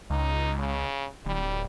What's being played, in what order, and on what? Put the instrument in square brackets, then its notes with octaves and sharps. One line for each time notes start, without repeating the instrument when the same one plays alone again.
[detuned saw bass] C#2 [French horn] D#4
[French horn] C#3
[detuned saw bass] D1 [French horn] G3